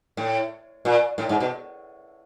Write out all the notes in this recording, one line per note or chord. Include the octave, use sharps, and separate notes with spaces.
A2
A#2
A2
G#2
B2